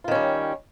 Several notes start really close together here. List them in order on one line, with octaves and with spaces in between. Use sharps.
F4 D#3 C#4 G3